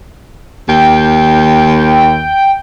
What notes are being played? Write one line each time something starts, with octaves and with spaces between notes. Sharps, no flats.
D#2 G5